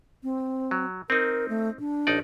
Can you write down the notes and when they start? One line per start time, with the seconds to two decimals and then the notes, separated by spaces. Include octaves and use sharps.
0.24 C4
0.71 F#3
1.10 C4 D#4 A#4
1.49 A3
1.80 D4
2.07 A1 D#4 D5